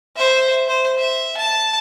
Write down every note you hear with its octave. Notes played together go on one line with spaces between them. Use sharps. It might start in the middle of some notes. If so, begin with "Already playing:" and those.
C5 E5
C5
E5
A5